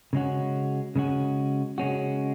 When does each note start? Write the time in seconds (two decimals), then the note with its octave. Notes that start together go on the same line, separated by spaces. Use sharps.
0.13 C#3 G#3 C#4 F#4
0.96 C#3 G#3 C#4 F#4
1.78 C#3 G#3 C#4 F#4